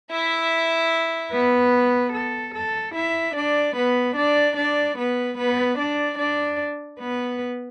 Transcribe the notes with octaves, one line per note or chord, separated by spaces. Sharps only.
E4 E5
B3 B4
A4
A4
E4 E5
D4 D5
B3 B4
D4 D5
D4 D5
B3 B4
B3 B4
D4 D5
D4 D5
B3 B4